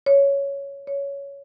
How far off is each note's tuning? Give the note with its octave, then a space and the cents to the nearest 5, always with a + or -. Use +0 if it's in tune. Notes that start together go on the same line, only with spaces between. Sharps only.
C#5 +5
C#5 +10